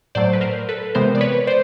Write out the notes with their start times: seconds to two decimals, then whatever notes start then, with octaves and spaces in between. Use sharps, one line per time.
0.15 A2 F#3 A3 C5 D5
0.33 B4
0.41 A#4 C5
0.69 A4 B4
0.95 C3 E3 G#3 B3 A#4 C5
1.15 D5
1.21 B4 C#5
1.47 C5 D5